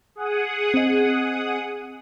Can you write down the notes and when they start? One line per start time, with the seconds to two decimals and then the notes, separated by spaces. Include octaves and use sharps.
0.16 G#4 F#5 D#6
0.74 C4 D#5